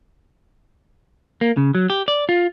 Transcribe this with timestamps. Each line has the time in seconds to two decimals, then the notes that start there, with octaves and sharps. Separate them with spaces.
1.41 A#3
1.57 C#3
1.75 F#3
1.90 G4
2.08 D5
2.29 F4